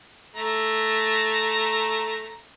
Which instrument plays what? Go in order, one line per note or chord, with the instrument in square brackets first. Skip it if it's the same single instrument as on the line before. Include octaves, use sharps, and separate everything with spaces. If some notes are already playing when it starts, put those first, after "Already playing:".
[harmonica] A3 A#5